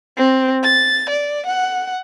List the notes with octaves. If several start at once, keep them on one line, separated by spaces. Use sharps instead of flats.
C4
A6
D5
F#5